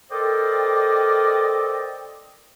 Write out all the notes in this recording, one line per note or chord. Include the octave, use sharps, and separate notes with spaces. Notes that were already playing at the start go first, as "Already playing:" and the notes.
A4 A#4 C5 D5 D#5 G5